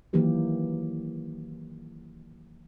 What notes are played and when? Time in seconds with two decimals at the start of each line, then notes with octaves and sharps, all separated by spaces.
0.13 D#3 E3 F#3 A#3 G4 A#4